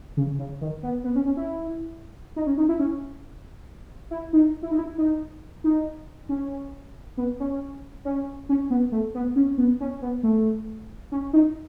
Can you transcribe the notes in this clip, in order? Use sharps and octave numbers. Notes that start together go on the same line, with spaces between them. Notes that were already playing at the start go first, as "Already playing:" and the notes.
C#3
C#3
D#3
B3
B3
C#4
C#4
E4
D#4
C#4
D#4
E4
C#4
E4
D#4
E4
D#4
E4
D#4
D#4
C#4
B3
C#4
C#4
C#4
B3
A3
B3
C#4
B3
C#4
B3
A3
C#4
D#4